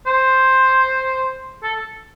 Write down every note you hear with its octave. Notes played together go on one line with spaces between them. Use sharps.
C5
A4